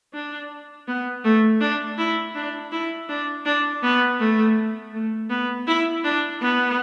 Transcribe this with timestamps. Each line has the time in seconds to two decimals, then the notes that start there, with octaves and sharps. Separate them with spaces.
0.14 D4
0.88 B3
1.24 A3
1.61 D4
1.98 E4
2.35 D4
2.72 E4
3.09 D4
3.46 D4
3.83 B3
4.20 A3
4.93 A3
5.30 B3
5.67 E4
6.04 D4
6.41 B3